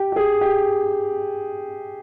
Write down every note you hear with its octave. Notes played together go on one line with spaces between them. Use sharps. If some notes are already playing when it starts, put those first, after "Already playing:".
Already playing: G4
G4
G#4
G4